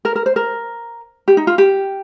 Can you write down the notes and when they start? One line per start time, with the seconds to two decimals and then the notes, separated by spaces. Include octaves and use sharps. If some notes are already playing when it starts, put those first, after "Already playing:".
0.05 A#4
0.16 A#4
0.26 C5
0.36 A#4
1.28 G4
1.37 D#4
1.47 F4
1.58 G4